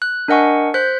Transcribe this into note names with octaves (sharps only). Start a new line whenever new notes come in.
F#6
D4 A#4 D#5 F#5 G#5 C#6
C5 F#6 G6 B6